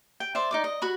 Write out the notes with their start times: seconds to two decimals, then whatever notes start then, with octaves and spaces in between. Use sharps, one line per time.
0.20 G5
0.35 C5 D5 E5
0.51 D#4 D5 D6
0.64 D#5
0.82 F#4 B5 C#6